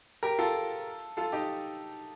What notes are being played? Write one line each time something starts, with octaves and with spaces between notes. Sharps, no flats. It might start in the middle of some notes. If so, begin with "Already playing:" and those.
G4 A#4
F4 A4
F4 A4
D#4 G4